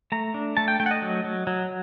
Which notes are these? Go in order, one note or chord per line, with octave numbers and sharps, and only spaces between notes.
A3 A#5
D4
A3 A5
G5
A3 G5
F#5
D#5
F#3
F#3
F#3